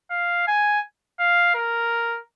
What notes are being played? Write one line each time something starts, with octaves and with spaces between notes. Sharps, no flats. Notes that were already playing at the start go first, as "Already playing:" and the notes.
F5
G#5
F5
A#4